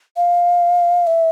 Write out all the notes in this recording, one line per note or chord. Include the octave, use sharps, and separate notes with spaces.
F5
E5